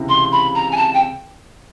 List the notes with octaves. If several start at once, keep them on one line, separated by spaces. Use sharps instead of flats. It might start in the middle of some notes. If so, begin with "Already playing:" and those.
Already playing: C#2 C3 E3
C6
B5
A#5
G#5
A5
G5